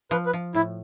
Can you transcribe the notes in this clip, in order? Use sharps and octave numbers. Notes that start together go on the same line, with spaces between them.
F3 B4
B4
F3
A2 E4